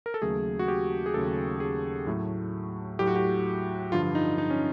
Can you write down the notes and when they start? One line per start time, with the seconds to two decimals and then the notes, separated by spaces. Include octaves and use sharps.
0.06 A#4
0.14 A4
0.22 D#2 C#3 F#3 A3 G#4
0.59 F#4
0.68 G4
1.06 G#4
1.14 D#2 C#3 F#3 A3 A4
1.60 G#4
2.07 A2 F#3 A3
2.99 A2 F#3 A3 G4
3.07 F#4
3.16 G4
3.92 G2 D3 F3 F4
4.15 D#4
4.38 D#4
4.50 C#4